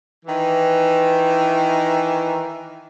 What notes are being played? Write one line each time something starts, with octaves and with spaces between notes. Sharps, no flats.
D#3 E3